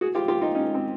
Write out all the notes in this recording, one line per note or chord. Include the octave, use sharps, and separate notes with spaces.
F#4 G#4
F4 G4
F4 G4
D#4 F4
C#4 D#4
C4